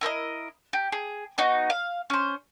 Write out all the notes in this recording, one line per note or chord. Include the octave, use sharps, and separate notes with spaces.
E4 A#4 C5 D#5
G4
G#4
B3 D#4 F#4
F5
C#4 C5